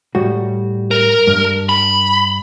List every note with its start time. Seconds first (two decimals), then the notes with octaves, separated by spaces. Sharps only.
0.15 A2 G3 F#4
0.91 A#4
1.27 G2
1.69 B5